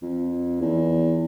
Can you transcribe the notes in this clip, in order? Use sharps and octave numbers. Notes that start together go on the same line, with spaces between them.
F2
E2